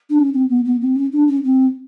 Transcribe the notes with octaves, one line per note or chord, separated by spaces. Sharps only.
D4
C#4
C4
B3
B3
C4
C#4
D4
C#4
C4